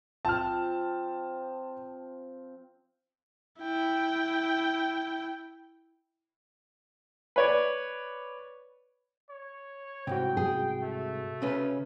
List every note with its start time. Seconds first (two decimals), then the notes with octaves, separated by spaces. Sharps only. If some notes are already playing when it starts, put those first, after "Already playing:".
0.25 F3 C4 A5 F6
3.60 E4 G5
7.36 B4 C#5 D5
9.30 C#5
10.07 C2 G#2 C3 F#4 G5
10.37 G#4
10.83 A3
11.42 C#3 C#4 B4